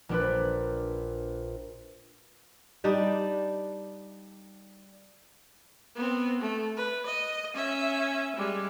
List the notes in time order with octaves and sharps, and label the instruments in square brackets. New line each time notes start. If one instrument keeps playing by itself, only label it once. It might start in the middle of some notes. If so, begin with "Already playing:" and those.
[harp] A#1 D4 B4
[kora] G3 D4 D#4
[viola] B3 C4
A3
B4
D#5
C#4 E5
G3 G#3